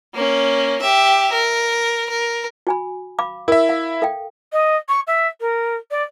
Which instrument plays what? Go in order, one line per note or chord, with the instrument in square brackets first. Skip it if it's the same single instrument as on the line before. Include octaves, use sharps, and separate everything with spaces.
[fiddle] A#3 C#4
G4 E5
A#4
A#4
[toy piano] F#4 G#5 B5
F5 B5 D6
[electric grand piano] E4 E5 [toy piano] A#4
[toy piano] F5
A4 F5 G5
[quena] D#5
C#6
E5
A#4
D5